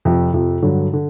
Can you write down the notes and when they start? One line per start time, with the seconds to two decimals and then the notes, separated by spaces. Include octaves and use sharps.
0.05 F2 C3 F3
0.34 F2 C3 F3
0.62 G2 D3 F#3
0.93 D3